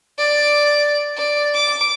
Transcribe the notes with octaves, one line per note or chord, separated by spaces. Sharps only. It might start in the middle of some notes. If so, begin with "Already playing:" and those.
D5
D5
D6